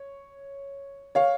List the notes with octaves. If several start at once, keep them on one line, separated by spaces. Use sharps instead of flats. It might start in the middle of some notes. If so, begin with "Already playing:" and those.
Already playing: C#5
C#5 F5